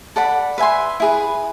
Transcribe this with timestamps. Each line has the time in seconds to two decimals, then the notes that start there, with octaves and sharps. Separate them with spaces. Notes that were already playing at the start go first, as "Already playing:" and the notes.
0.16 A4 D5 F#5 B5
0.58 B4 E5 G#5 C6
1.00 E4 G#4 B4